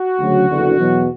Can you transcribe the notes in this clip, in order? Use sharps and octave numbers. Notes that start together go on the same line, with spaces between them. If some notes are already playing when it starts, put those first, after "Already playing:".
Already playing: F#4
D2 C#3 F#3
F#1 E2 D3
E2 B2 F#3